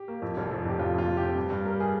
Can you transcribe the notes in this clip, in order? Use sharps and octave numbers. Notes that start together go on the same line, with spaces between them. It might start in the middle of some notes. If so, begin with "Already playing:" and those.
Already playing: G4
A#3
F2
F1
F2
F2 G4
F2 F4
F2 F4
F1
G4
C3
G2
G2
G3 A#4
G#4